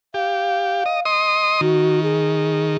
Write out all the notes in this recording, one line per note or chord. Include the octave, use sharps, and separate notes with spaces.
G4 F5
D#5
D#5 C6 D#6
D#3 F#4
G#4